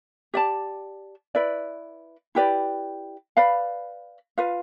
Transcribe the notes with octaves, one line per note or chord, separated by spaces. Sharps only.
G4 D5 A5
E4 B4 D5
E4 G4 B4 D5
B4 D5 F5 B5
F4 B4 F5